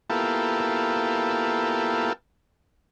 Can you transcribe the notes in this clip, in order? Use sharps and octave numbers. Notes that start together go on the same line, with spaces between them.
A#3 B3 E4 F4 G4 A4